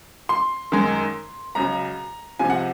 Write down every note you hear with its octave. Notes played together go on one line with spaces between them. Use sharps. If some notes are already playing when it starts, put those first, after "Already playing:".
C6
F#2 D#3 G#3
C#2 C#3 F#3 A#5
C#2 C3 F3 G#5
F#5